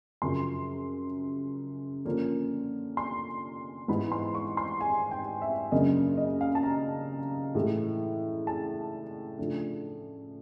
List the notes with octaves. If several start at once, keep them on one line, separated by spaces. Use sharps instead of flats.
F#2 C#3 F3 C6
D3 F3 A#3 C#4
C6
G#2 E3 G#3 B3 B5
C6
C#6
C6
G#5
G5
E5
F#2 C#3 F#3 A#3 D4 D#5
D#5
F5
A5
A#5
A2 E3 G#3
A5
C#3 F3 A3 D4